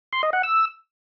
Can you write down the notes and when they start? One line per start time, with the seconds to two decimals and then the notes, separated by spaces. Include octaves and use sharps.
0.13 C6
0.23 D#5
0.33 F#5
0.43 E6